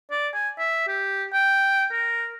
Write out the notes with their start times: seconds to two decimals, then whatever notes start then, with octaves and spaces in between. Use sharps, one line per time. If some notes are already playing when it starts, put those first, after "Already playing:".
0.11 D5
0.34 G#5
0.58 E5
0.87 G4
1.33 G5
1.91 A#4